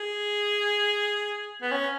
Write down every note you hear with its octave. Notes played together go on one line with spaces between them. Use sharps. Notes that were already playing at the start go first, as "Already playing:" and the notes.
Already playing: G#4
B3
C#4